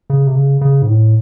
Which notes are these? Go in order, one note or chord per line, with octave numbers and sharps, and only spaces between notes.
C#3
C3
C#3
C#3
G#2
A2